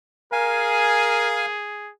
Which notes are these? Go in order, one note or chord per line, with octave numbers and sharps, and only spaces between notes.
G#4 A#4 F5 G#5